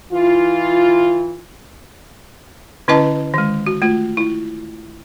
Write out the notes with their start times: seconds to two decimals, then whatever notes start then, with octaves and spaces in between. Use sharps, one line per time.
0.12 E3 E4 F4
2.88 D3 C#4 E4 B4 D#5 A5
3.34 D#3 G#3
3.67 F#4
3.82 A3 F4
4.17 E4